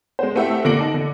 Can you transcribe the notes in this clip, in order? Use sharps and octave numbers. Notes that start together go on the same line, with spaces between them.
G#3 C5
A3 C4 E4 G4 E5 F#5
A#2 D3 A#3 A#6 D7 F#7
D#4 A5
D3